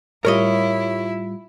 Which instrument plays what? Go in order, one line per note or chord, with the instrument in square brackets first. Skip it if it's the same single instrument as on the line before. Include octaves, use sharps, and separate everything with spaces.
[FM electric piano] A2 G3 F4 [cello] E4 [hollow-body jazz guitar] A#4 C#5 D#5